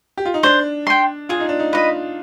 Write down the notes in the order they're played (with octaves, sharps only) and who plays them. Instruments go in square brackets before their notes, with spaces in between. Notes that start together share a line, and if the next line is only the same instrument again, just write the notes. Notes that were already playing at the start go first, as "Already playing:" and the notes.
[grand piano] G4
F4
D#4
[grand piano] D4 [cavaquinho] C5
[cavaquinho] G5 C6
[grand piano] F4 [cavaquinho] G#4
[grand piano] D#4
D4
D#4
[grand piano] F4 [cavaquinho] B4 D#5